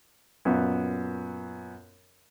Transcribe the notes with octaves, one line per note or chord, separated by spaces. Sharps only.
F#2 A#2 B3